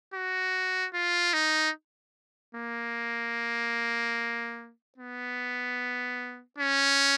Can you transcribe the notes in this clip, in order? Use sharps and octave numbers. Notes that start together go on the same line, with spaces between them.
F#4
F4
D#4
A#3
B3
C#4